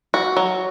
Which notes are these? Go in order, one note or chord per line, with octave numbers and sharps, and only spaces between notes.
F#4
F#3